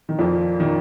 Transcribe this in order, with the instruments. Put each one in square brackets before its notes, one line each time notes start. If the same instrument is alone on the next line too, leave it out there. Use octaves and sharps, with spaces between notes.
[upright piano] D#3
[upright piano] F2 F3 [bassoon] A#2
[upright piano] D#3